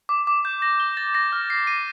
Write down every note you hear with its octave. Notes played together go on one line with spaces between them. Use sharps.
D6
D6
G6
A#6
G7
A6
A#6
F6
C7
D#7